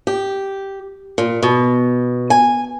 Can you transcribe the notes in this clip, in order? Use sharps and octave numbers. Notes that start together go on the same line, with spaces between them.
G4
A#2
B2
G#5